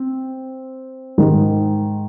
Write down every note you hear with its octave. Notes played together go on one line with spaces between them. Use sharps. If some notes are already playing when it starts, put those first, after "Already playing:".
Already playing: C4
G#2 D#3 G#3